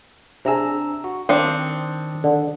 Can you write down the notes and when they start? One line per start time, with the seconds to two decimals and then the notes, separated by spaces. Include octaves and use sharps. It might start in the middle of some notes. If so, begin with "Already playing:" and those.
0.45 C3 D4 G#4 A#5 E6
1.04 F#4
1.29 D#3 C4 D4 D#6 C#7
2.24 D3